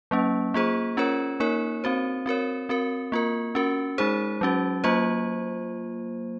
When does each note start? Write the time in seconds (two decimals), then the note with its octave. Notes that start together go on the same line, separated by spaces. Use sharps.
0.11 F#3 A#3 C#4
0.54 A#3 F4 G#4 C5
0.97 C#4 F4 A#4 C#5
1.40 A#3 D#4 A#4 C#5
1.84 C4 F#4 C5
2.26 C4 F#4 A#4 C#5
2.69 C4 F#4 A#4
3.12 A#3 F4 A#4
3.55 C#4 F#4 A#4
3.98 G#3 D#4 G#4 C5
4.41 F#3 C#4 F#4
4.84 F#3 A#3 F4 C5